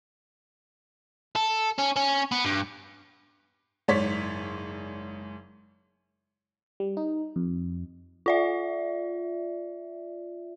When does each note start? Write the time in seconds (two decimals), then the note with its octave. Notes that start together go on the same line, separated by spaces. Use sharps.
1.36 A4
1.79 C#4
1.96 C#4
2.32 B3
2.45 G2
3.88 F#1 G#2 C#5 D5 C6 B6
6.80 G3
6.97 D#4
7.36 F2
8.26 F4 D5 E5